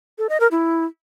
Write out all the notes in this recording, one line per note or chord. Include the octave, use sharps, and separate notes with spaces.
A4
D#5
A#4
E4